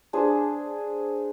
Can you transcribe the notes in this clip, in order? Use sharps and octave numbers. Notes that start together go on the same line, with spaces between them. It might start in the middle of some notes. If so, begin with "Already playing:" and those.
D4 G#4 C5